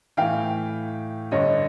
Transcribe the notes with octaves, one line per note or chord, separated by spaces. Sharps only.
A2 E3 F5 G5
G2 D3 C#5 D#5